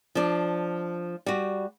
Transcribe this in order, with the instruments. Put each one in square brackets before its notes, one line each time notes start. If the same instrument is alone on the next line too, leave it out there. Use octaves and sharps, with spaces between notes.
[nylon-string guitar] F3 D4
G3 F#4